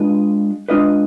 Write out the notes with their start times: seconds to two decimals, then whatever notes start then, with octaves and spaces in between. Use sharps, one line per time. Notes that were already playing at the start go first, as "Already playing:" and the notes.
Already playing: G#3 D4 F4 B4 D#5
0.69 G#3 D4 F4 B4 D#5